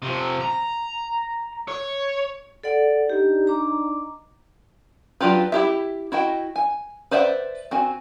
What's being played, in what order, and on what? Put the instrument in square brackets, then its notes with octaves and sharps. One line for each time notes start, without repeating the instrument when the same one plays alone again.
[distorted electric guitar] C3 F3
A#5
C#5
[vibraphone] A4 D5 F#5
[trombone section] D4 D#4 [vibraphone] G4
[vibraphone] A#5 D6
[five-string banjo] F#3 D4 F4 G4 B4
E4 G4 E5
E4 F#4 D#5 G5
G#5
B4 C5 D5 E5 F#5
C4 F#4 G#5